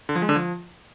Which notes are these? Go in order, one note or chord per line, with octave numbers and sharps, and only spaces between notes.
D3
F3
G#3
D3
F3